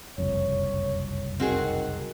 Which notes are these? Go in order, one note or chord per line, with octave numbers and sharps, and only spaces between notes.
F#1 C2 F2 C#5
D#3 C4 F#4 G#4